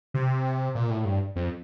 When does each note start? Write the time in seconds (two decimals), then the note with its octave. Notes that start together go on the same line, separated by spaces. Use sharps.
0.14 C3
0.75 A#2
0.90 A2
1.05 G2
1.36 F2